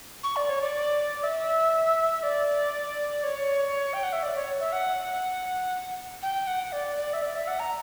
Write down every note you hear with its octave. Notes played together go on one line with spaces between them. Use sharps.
C#6
D5
C#5
D5
E5
D5
C#5
G5
F#5
E5
D5
C#5
E5
F#5
G5
F#5
D5
D5
E5
D5
E5
F#5
A#5